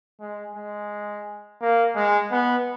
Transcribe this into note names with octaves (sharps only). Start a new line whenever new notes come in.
G#3
G#3
A#3
G#3
B3